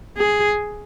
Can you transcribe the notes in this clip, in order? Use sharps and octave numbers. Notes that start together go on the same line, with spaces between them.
G#4